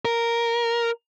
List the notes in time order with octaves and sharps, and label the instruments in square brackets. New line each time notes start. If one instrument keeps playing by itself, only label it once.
[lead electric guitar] A#4